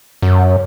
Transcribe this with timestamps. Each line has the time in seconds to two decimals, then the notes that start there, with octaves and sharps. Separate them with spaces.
0.22 F#2